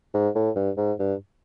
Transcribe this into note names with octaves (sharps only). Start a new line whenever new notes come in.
G#2
A2
G2
G#2
G2